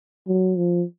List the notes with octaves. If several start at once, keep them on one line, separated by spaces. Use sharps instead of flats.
F#3
F3